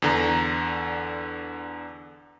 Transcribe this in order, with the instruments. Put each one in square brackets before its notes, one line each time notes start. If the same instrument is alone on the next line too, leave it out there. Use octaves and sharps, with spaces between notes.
[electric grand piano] E2 D3 A#5